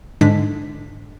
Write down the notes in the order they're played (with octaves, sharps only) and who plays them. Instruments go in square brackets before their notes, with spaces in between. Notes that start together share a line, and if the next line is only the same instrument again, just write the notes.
[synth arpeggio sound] G#2 D3 G#3 D4 B6